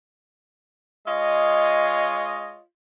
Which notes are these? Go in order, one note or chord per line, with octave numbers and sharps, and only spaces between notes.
G#3 F4 C#5 D#5